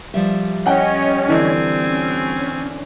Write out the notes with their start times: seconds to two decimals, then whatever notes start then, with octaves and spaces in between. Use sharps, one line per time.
0.14 F3 G3 E5
0.66 C#4 C#5 D#5 F#5 G5
1.28 D3 E3 C4 D4 G#5
1.87 C#4